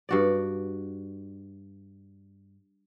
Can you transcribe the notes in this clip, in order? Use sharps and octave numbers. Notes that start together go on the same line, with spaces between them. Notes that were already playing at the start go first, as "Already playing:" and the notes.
G2 F#4 D5